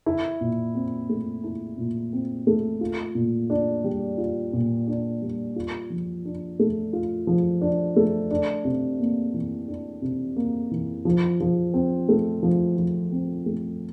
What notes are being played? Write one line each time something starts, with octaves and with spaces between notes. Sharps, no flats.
E4
A#2
C4
A3
E4
A#2
C4
A3
F4
A#2
D4
G3
F4
A#2
D4
G3
F4
F3
D4
A3
F4
F3
D4
A3
D4
C3
A#3
E3
D4
C3
A#3
E3
F3
F3
C4
A3
F3
F3
C4
A3